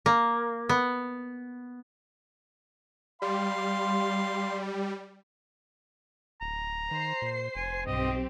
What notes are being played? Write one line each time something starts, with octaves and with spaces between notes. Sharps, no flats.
A#3
B3
G3 F5 C6
D1 A#5
D#3 C5 C7
A#2
F1 G#5
B1 G2 C4 G4 D#5